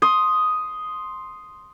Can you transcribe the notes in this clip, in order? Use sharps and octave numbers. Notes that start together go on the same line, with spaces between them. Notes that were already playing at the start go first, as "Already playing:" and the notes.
C6 D#6